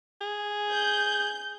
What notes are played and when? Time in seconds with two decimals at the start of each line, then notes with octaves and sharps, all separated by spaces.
0.21 G#4
0.71 G6